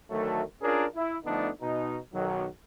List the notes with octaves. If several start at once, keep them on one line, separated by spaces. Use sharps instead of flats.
D2 D#3 F#3 A3
C#4 D4 F4 G#4 A#4
E4
D3 F3 A3 B3 D4 D#4
B2 D#4
B1 D#3 F#3